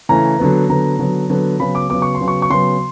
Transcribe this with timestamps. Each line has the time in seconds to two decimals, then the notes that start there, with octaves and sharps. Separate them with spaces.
0.09 C#3 E3 A3 C#4 A#5
0.39 D3 F#3 B3
0.69 D3 F#3 B3 A#5
0.99 D3 F#3 B3
1.30 D3 F#3 B3
1.60 C#3 F#3 B3 B5
1.75 D6
1.90 C#3 F#3 B3 D6
2.02 C#6
2.15 C6
2.20 C#3 F#3 B3
2.28 C#6
2.42 C#6
2.50 C#3 F#3 B3 C6